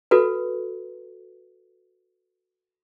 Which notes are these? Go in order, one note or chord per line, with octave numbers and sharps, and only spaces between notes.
F#4 A4 B4